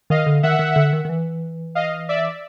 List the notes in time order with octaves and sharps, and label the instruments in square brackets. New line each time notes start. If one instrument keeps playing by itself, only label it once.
[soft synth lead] D#3 [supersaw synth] D#5 F5
[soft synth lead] D3
[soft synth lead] D#3 [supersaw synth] E5 F#5
[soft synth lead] D#3
D3
D#3
D#3
E3
[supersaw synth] D#5 F5
D5 E5